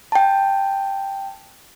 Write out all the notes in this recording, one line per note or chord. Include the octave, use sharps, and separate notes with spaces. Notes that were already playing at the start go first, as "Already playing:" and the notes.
G5 A5